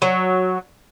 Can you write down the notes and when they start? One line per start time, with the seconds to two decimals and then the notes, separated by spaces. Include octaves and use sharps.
0.02 F#3